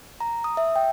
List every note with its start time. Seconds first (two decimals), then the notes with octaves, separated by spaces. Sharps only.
0.21 A#5
0.44 D#6
0.57 E5
0.76 G5